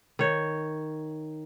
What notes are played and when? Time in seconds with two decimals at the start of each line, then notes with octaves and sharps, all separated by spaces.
0.19 D#3 C#5